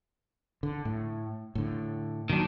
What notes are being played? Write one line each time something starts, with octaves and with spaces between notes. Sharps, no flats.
D3
A2
A2 D3
A#2 D#3 F#3 D4